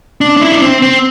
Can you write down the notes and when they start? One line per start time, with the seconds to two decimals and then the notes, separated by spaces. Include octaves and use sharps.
0.21 D4
0.37 D4
0.41 E4
0.52 D4
0.62 C4
0.82 C4